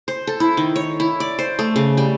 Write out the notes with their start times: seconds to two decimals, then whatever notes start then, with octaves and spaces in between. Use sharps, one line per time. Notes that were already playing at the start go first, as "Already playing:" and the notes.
0.08 C5
0.27 A4
0.40 E4
0.57 D#3
0.76 C#5
1.00 E4
1.20 D5
1.39 C5
1.59 A3
1.76 C#3
1.97 G3